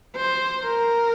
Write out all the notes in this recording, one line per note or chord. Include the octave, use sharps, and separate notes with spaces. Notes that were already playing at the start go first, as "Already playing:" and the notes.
C5
A#4